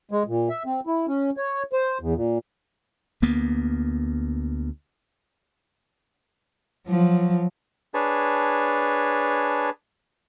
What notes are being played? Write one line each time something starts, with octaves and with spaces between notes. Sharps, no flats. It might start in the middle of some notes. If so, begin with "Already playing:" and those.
G#3
A#2
E5
C4
E4
C#4
C#5
C5
E2
A#2
D2 A#3 B3
F3 F#3
D4 G#4 B4 C#5 A5